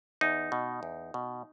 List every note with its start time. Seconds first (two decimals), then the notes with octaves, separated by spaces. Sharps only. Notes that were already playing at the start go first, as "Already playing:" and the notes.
0.21 E2 D#4
0.52 B2
0.83 E2
1.14 B2